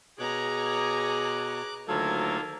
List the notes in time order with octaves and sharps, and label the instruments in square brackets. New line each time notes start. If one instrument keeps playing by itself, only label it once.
[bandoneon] B2 [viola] G#4 [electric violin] C#5 A#5 [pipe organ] D6 F#6
[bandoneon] D2 F#3 A4 [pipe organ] D#3 A#3 F4 [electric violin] G#6